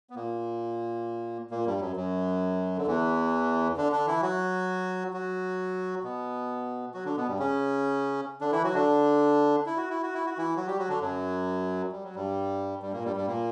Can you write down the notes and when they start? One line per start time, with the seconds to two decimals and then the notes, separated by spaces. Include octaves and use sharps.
0.10 B3
0.15 A#2 A#3
1.50 A#2 A#3
1.67 G2 G3
1.81 F#2 F#3
1.96 F#2 F#3
2.77 D3
2.87 E2 E3
3.77 D3 D4
3.92 D3 D4
4.08 E3 E4
4.22 F#3 F#4
5.13 F#3 F#4
6.03 B2 B3
6.94 F#3 F#4
7.05 D3 D4
7.16 B2 B3
7.28 G2 G3
7.39 C#3 C#4
8.41 D3 D4
8.52 E3 E4
8.64 F#3 F#4
8.74 D3 D4
9.66 E4
9.77 F#4
9.90 E4
10.02 F#4
10.14 E4
10.26 F#4
10.38 E3 E4
10.56 F#3 F#4
10.67 G3 G4
10.78 F#3 F#4
10.89 D3 D4
11.01 F#2 F#3
11.92 G3
12.04 F#3
12.15 G2 G3
12.82 G2 G3
12.93 A#2 A#3
13.05 G2 G3
13.16 G2 G3
13.27 A#2 A#3